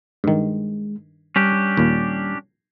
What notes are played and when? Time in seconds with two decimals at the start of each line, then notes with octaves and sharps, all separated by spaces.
0.24 G2 D#3 G#3
1.36 G3 C#4 D4 G4
1.77 D#2 A#2